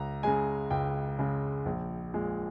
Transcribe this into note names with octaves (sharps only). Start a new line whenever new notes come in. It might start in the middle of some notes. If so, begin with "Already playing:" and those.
Already playing: C#2 A#5
C#3 G#3 G#5
C#2 G5
C#3 G#3
A#1
A#2 G#3